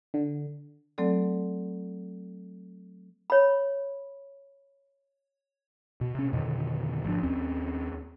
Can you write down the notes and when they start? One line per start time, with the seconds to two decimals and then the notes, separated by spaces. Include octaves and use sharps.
0.14 D3
0.98 F#3 A3 C4 A4 D5
3.30 C#5 B5
6.01 B2
6.15 C3 C#4
6.33 F2 B2 D3 D#3
7.04 G#1 F3 D4
7.23 D#2 C4 C#4